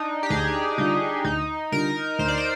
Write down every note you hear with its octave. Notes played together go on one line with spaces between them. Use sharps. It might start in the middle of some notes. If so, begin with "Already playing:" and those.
Already playing: D4 D#4
G4
D2 G#4
D3 G3 D4 D#4 F4
D2 D#4
D3 G3 D4 F4 A#4
D2 C5
D5
C5